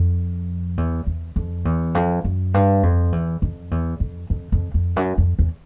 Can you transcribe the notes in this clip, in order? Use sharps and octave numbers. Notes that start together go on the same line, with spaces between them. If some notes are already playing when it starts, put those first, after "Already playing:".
Already playing: F2
E2
E2
F2
E2
F2
F#2
G2
F2
E2
F2
E2
F2
F2
F2
F2
F#2
F2
E2